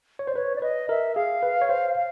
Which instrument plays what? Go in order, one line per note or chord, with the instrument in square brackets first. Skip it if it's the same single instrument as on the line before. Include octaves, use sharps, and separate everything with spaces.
[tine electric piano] C#5
[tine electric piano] C5 [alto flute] D5
[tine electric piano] B4 [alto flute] C#5
[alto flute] D5
[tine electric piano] B4 [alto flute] D#5
[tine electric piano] A#4 [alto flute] E5
[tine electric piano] G#4 [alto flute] F5
[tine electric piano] B4
C#5
C5
[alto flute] F5